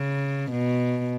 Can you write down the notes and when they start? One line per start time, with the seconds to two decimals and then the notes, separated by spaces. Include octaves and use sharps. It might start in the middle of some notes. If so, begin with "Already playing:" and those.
Already playing: C#3
0.52 B2